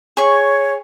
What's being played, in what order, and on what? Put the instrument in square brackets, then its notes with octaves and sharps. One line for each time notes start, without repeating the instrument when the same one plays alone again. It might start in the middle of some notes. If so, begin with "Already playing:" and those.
[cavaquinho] G#4 C#6 [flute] C#5